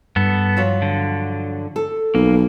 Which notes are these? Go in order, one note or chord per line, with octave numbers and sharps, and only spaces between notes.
G2 B3 A4
F3 F#3
D3
A4
B1 A#3